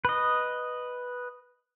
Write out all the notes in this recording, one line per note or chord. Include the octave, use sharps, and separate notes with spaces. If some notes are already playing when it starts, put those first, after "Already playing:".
B4 D#5